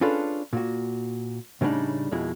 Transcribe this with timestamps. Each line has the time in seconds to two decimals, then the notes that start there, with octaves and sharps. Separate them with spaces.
0.01 C#4 D4 F4 G#4 A4 B4
0.53 A#2 F#4
1.61 A2 C#3 G3 B3 D4 D#4
2.12 F2 B2 G#3 E4